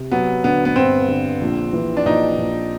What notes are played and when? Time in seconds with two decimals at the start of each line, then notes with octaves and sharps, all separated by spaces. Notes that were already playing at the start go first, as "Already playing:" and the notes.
Already playing: C3
0.12 F#3 B3
0.44 D3 B3
0.65 B3
0.76 G2 C4
1.08 D3
1.41 A#1
1.73 E3
1.97 D4
2.06 A#1 D#4
2.38 A#1